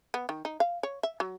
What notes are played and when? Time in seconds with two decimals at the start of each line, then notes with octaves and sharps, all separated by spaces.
0.14 B3
0.29 D#3
0.45 D#4
0.60 F5
0.83 C#5
1.03 E5
1.20 F#3